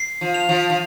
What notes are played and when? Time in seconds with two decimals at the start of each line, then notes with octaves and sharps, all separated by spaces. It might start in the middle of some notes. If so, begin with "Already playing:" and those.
Already playing: C7
0.21 F3
0.34 F7
0.49 F3
0.70 F3